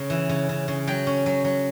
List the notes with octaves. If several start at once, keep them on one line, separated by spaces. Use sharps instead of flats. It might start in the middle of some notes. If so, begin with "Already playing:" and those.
Already playing: C#3 A#5
E3
C#3
C#3
C#3
F#3 G5
C#4
F#3
F#3